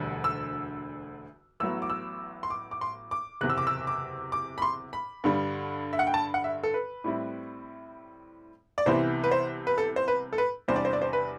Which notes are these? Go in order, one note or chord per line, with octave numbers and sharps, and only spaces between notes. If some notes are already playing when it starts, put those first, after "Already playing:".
Already playing: E1 D2 D3 G3
E6
A1 A2 F#3 B3 E6
D6
E6
C6
D6
D6
C6
D6
F#1 E2 C3 F#6
E6
D6
E6
D6
D6
B5
C6
B5
G2 D3 G3
E5
F#5
G5
A5
F#5
E5
A4
B4
A2 G3 C4 E4
D5
C2 C3 E3 B3 E4 C5
B4
C5
B4
A4
C5
B4
A4
B4
E2 C3 G3 D4 C5
D5
C5
D5
C5
B4